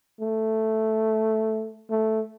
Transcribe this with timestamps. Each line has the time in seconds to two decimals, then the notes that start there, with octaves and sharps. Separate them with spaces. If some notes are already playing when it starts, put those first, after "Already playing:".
0.21 A3
1.90 A3